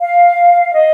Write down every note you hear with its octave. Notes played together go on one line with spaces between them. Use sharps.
F5
D#5